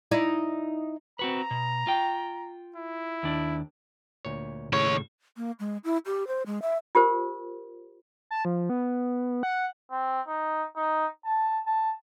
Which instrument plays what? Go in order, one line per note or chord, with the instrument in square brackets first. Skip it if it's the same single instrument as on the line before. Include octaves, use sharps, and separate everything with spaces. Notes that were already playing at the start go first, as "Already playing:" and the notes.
[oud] D#4 E4 D5
[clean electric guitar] C4 F#4 B4 [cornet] A#5
[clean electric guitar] B2
F4 G5
[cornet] E4
[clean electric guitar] D#2 D4
[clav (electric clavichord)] D2 A#2 C#5
[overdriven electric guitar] D#2 C#5 [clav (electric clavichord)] A2 C#3
[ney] A#3
G#3
E4
G4
C5
G#3
E5
[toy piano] F4 G4 A#4 C5
[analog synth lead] A5
F3
B3
F#5
[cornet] C4
D#4
D#4
A5
A5